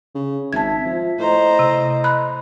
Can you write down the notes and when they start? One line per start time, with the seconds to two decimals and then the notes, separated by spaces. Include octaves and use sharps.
0.15 C#3
0.53 G#1 E5 A5 G#6
0.85 F3
1.19 A2 C5 D#5 A#5
1.59 C3
2.04 B5 F#6